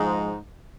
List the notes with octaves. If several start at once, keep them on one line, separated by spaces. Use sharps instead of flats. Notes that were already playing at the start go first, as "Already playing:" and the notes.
Already playing: G#2 F3 G#3 D#4